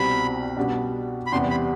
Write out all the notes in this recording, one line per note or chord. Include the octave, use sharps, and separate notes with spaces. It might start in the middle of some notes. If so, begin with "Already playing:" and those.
Already playing: C2 B2 G3 C4 B5
B2 G3 B3 D4
B5
E2 C3 G3 B3 C6
B5